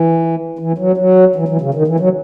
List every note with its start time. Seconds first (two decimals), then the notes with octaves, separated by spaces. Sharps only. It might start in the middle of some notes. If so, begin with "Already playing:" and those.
Already playing: E3
0.59 E3
0.78 F#3
0.98 F#3
1.36 E3
1.48 E3
1.61 C#3
1.74 D#3
1.87 E3
2.00 F#3